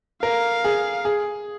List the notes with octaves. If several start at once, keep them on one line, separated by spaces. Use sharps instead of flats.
A#4 F5
G#4
G#4